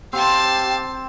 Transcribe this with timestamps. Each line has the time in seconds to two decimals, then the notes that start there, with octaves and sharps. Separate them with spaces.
0.13 C4 G4 F5 A5